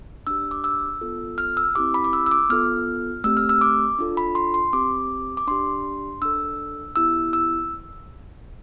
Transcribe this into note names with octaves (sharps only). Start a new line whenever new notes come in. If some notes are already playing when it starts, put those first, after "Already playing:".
D4 G4 E6
D6
E6
B3 F4 A4
F6
E6
C4 E4 G4 D6
B5
D6
E6
E6
D6
B3 F4 A4 F6
A3 C4 G4 E6
F6
E6
D6
D4 F4 A4
B5
C6
C6
C4 G4 D6
D6
D4 G4 C6
D4 A4 E6
B3 E4 G4 E6
E6